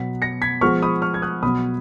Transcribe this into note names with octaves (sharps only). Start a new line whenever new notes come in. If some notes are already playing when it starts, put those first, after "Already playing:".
Already playing: B2 F#3 B3 B6
A#6 C#7
G#6 B6
F3 G#3 B3 C#6 F6
B5 D#6
C#6 F6
G#6
D#6 F#6
B2 F#3 B3 B5 D#6